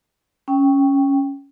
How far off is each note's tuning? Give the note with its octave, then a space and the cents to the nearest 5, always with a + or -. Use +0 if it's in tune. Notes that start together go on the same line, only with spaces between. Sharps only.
C#4 +0 G5 +0